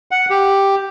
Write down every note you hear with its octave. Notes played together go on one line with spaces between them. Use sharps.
F#5
G4